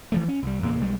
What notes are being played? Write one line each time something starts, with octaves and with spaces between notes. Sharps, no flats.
E3 F3 A3
C#4
C2 G3
E2 A#2 C#3 A#3
B1 G3 G#3